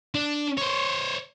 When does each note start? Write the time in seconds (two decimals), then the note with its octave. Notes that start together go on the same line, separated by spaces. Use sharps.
0.15 D4
0.58 C5 C#5